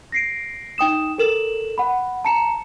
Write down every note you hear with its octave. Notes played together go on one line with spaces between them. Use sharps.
A#6 C7 D7
D#4 G5 D#6 E7
A4 A#4 E7 F#7
F#5 B5
A5 A#5 C#7 E7